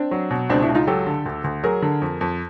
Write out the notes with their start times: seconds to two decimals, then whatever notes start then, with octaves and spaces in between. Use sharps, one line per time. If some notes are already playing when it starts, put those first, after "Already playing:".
Already playing: C4 D4
0.11 F#3
0.30 B2
0.49 C#2 C4 D4
0.62 D4 E4
0.69 C#2
0.75 D#4 F4
0.87 F#3 G4 A4
1.07 D3
1.26 D2
1.44 D2
1.64 F#3 G#4 A#4
1.82 D3
2.02 F2
2.21 F2